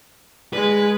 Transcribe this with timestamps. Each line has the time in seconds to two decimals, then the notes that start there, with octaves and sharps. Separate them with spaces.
0.53 G#3 B4